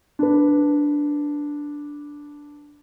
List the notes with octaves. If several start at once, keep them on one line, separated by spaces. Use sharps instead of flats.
D4 B4